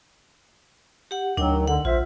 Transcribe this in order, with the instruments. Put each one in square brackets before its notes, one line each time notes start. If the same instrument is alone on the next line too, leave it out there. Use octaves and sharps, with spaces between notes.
[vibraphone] G4 F#5
[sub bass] D2 [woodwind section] D#3 F#3 [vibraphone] D4 G5
[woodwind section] D3 [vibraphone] F#5
[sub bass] A#1 [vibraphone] F4 [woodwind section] C5 E5